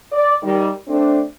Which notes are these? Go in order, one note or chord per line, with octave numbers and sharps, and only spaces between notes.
D5
D#3 G3
A3 C4 D4